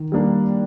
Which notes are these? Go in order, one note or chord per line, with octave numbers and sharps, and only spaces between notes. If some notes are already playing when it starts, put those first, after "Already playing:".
Already playing: D#3
G3 A#3 D4